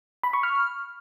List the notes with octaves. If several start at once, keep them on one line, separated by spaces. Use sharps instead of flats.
B5
C#6
F6